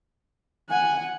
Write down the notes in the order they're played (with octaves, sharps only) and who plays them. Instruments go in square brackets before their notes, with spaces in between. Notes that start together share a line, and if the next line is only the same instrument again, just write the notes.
[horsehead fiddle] F#5 [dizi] G#5